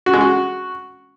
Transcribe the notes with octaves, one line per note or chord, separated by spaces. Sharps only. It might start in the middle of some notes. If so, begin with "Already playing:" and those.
F#4
G#3
F#4